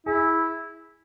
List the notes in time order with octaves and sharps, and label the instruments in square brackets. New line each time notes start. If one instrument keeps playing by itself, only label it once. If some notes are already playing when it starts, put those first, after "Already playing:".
[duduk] E4 [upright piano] G#4